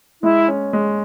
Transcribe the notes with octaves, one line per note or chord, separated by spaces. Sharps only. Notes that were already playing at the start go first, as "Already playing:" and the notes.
G#3 E4
C#4
G#3